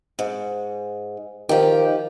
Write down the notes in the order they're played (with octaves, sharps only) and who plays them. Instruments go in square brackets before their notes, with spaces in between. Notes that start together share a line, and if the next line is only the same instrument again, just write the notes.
[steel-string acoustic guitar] G#2
[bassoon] D#3 [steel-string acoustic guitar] F3 G4